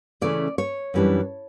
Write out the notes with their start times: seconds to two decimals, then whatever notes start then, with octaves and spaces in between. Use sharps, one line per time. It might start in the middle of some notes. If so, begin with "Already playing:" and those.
0.21 C#3 E3 A3 C#4 D5
0.58 C#5
0.94 F#2 E3 G3 D4